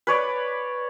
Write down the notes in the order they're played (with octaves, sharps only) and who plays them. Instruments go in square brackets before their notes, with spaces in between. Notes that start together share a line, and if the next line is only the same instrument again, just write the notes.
[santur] B4 C#5 D5